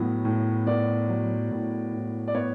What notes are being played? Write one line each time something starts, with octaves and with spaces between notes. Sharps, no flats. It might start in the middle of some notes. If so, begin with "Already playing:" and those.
Already playing: A2 F#3 B3
A2
B3 D5
F#3
A2
A2
D5
B3 C#5